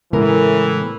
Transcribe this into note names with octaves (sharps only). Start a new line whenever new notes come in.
A2 C#3 E3 G#3 B3 A#4